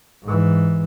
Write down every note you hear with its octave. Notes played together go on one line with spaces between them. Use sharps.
G#2 E3